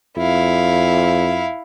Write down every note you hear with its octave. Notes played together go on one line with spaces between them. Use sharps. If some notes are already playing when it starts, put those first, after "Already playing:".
F2 E4 F5